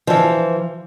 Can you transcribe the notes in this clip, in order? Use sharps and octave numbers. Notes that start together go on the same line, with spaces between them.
E3 F3